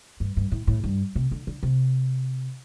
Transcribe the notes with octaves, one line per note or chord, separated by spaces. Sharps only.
G2
G2
A2
A2
G2
C3
D3
D3
C3